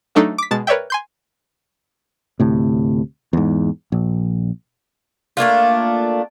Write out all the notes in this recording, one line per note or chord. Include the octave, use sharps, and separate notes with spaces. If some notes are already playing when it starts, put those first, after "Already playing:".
F#3 A3 D4 D#4 A4
D6 B6
B2 G#3 A5 A6
A#4 B4 C#5 D5 E5 G5
G#5 C6 G6
D2 A2 C3
E2 G#2
A#1
A3 A#3 D4 F4